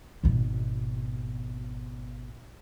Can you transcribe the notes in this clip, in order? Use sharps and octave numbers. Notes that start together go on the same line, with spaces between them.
G#1 B2